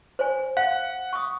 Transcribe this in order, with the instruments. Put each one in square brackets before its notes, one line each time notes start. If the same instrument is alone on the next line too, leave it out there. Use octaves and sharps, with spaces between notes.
[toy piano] C5 C#5 G#5
[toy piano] F5 [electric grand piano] F#5
[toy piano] C#6 D#6